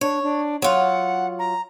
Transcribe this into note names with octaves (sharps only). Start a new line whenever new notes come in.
D4 C#5
D4
F#3 F4 F#5
A#5